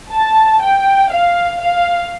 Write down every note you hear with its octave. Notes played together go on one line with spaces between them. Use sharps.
A5
G5
F5
F5